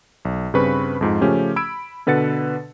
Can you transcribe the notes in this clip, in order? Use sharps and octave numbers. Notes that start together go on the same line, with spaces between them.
B1
G2 C#3 C4 B4 B5 C#6
F2 G#2 F3
C#3 F3 A3 C#4 G4
B5 E6 G#6 D7
B2 D3 B4 F#5 A6 C#7